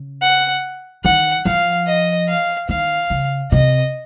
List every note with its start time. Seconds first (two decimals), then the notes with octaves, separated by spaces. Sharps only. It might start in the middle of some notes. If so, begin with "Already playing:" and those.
Already playing: C#3
0.22 F#5
1.05 D#3 F#5
1.45 F3 F5
1.87 D#5
2.28 F5
2.69 D#3 F5
3.10 C#3
3.52 C3 D#5